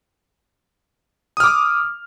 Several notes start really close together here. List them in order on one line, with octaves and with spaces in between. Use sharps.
D#6 F6 D6